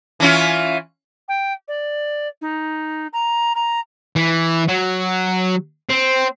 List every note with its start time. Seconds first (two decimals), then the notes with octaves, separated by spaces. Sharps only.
0.20 E3 C#4 F4
1.28 G5
1.68 D5
2.41 D#4
3.13 A#5
3.55 A#5
4.16 E3
4.68 F#3
5.89 C4